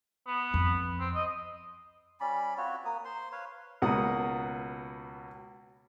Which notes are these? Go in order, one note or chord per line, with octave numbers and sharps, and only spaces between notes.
B3
F2
C4
D#5
G3 C#4 D5 B5
C4 F4 F#4 C#5
A#3 D#6
C5 C6
B4 C#5 F5
C#2 B2 A#3 F#5 A#5 D#6